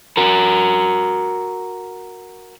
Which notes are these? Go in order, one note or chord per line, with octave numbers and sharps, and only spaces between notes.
F#4 A#4